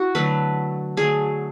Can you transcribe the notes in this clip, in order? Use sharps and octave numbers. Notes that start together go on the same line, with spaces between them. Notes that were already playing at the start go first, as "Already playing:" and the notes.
Already playing: E4 F#4
D3 F#3 A3 B4
D3 F#3 A3 G#4